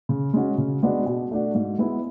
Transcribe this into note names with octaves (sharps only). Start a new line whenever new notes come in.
C#3
G#3 C#4 F#4
C#3
G#3 B3 D4 F#4
B2
A3 D4 F#4
G#2
G#3 B3 E4